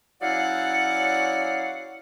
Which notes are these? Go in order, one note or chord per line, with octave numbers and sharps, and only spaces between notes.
F#3 C#4 E4 D5 F5 F#5